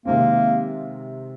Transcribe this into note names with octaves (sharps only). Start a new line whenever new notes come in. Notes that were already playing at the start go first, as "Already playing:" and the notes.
C3 D#3 G#3 A#3 C4